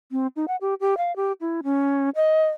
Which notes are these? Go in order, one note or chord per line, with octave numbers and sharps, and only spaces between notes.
C4
D#4
F#5
G4
G4
F5
G4
E4
C#4
D#5